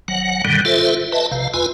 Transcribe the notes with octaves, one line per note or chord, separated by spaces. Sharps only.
G#1 F#3 F#5
G2 B2 D3 D#3 G3
F4 A4 C5 E5
B4 D#5 E5 A5
A#1 C3 F5
E2 F4 B4 G#5